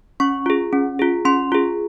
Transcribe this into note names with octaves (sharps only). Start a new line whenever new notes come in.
C#4 C#6
F4 G#4
C#4
F4 G#4
C#4 C6
F4 G#4